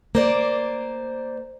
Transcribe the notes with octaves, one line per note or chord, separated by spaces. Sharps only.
A#3 C5 D5